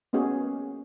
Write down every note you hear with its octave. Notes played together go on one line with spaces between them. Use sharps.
A#3 B3 C#4 F#4 G#4